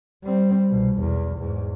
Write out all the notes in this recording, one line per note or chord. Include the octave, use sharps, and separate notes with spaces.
G3 C4
C2 B2
B1 E2
E2 G#2